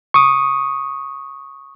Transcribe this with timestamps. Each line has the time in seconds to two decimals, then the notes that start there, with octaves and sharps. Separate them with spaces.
0.14 C#6 D#6